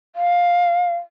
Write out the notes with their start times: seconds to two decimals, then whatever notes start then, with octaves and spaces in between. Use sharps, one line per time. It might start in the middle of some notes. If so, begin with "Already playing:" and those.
0.16 F5